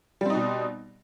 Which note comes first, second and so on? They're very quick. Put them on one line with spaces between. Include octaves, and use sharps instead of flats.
G3 C4 D#4 B2